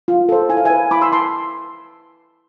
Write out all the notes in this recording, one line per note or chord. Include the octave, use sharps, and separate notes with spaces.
F4
A4 C5
E4 G#5
F5
B4 E5 G#5
E4 B5 D6
C6 E6
B4 A5 C6